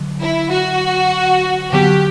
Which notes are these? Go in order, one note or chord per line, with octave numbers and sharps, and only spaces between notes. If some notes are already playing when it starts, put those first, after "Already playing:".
Already playing: D3 F#3
E4
F#4
D3 F#3 B3 G4